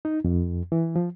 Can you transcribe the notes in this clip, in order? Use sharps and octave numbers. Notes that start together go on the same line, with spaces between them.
D#4
F2
E3
F3